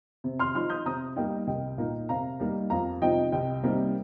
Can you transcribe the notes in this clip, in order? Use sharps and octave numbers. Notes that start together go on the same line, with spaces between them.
C3
C6 F6
F3 D#4 C6 F6
D#6 G6
C3 A#5 D#6
G3 A#3 D#4 D#5 G5
C2 D#5 G5
A#2 A#3 D#4
C3 F5 A#5
G3 A#3 D#4
F2 F5 A#5
C3 F3 D#4 D#5 G5
C2 D#5 G5
C3 G3 A#3 D#4